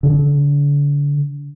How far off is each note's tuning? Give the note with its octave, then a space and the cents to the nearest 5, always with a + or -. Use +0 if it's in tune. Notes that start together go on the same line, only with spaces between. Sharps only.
D3 -35